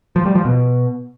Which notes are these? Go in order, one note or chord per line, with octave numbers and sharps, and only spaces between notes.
F3
G3
F3
B2